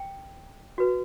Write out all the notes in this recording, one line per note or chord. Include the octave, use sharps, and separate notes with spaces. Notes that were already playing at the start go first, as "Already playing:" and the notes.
Already playing: G5
F#4 B4